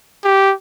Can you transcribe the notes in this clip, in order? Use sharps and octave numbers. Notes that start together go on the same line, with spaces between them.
G4